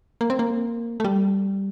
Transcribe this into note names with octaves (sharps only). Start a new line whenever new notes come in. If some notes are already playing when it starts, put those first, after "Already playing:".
A#3
C4
A#3
A3
G3